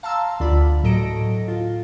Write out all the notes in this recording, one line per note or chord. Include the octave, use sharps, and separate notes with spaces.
F5 A5 A#5 C6 E6
D2 D3 F4 D5 B5
A2 F#3 A4 D#5 A#6 D7
F4